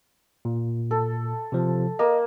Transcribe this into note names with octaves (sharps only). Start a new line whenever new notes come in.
A#2
A4
C3 F3
A#3 D#5